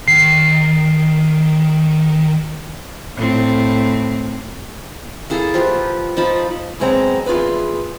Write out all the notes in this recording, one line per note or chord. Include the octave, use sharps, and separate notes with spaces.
D#3 C7
A2 C4
A#3 E4 G#4 A4
F3 F4 G4 B4
F3 D#4 A5 B5
B2 F#3 G#3 C4 A#5
E2 F4 G#4 B4